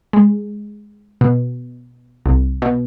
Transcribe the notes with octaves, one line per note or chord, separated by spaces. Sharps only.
G#3
B2
C2
B2